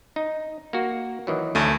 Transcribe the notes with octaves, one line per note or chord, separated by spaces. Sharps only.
D#4
A#3 F#4
D#3 E3 F#3
D2 A3